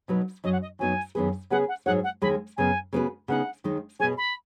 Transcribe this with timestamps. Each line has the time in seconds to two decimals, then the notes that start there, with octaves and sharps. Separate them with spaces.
0.08 B2 F#3 D#4 B4
0.44 F#2 F#3 C#4 D#5
0.53 F#5
0.62 D#5
0.79 F#2 F#3 B3 D#4 G#5
1.15 F#2 D#3 B3 G#4 B4
1.50 C#3 B3 G#4 B4 F#5
1.68 F#5
1.86 G#2 F#3 D#4 G#4 C#5 F#5
2.04 F#5
2.22 D#2 D#3 G#3 B5
2.57 F#2 C#3 B3 G#5
2.93 C#3 B3 F#4 B4
3.28 C#3 B3 D#4 F#5
3.64 D#2 D#3 G#3 D#4
4.00 B2 B3 G#4 C#5 G#5
4.17 B5